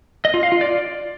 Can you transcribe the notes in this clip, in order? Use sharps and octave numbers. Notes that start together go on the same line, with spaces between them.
D#5
F4
F5
F4
D5